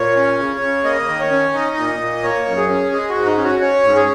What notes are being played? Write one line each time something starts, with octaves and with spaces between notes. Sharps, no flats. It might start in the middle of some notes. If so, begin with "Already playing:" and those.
Already playing: A#2 C#5
C#4
C#3
C#3
A#3 D#5
D#3
C#5
C#4
D#4 D#5
A#2
A#2
A#3 C#5
F#2
G#4
C#4
G#3 G#4
F#4
G#2
D#4
C#4
F#4
C#4 C#5
G#2
G#4